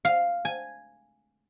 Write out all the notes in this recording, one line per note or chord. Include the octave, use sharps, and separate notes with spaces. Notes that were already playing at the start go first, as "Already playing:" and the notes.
F5
G#5